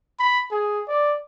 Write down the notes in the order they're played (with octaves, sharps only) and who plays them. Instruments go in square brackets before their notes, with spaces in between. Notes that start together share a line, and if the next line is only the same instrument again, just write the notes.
[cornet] B5
G#4
D5